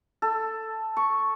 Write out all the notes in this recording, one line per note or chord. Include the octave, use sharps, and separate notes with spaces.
A4
C#6